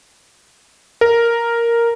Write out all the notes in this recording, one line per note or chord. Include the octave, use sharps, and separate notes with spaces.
A#4